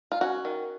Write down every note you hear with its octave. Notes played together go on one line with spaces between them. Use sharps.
F4
C#4 F#4
D#3